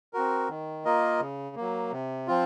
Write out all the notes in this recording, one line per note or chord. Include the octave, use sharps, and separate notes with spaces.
C4 F#4 A#4
D#3
A#3 F4 A#4 D#5
C#3
F#3 A#3
C3
F3 C4 F4